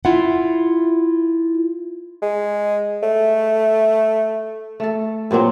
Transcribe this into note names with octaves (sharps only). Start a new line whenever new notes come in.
E4 F4 E5 F#5
G#3
A3
A3 A4
G2 A#2 F#3 C4